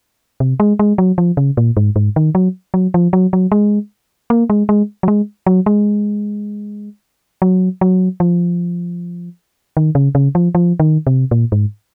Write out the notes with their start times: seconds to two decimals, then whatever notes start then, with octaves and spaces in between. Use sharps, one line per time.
0.40 C3
0.60 G#3
0.79 G#3
0.98 F#3
1.18 F3
1.37 C#3
1.57 A#2
1.77 G#2
1.96 G#2
2.16 D#3
2.35 F#3
2.74 F#3
2.94 F3
3.13 F#3
3.33 F#3
3.52 G#3
4.30 A#3
4.50 G#3
4.69 G#3
5.03 F#3
5.08 G#3
5.47 F#3
5.66 G#3
7.42 F#3
7.81 F#3
8.20 F3
9.77 D#3
9.95 C#3
10.15 C#3
10.35 F3
10.55 F3
10.80 D#3
11.07 C3
11.31 A#2
11.52 G#2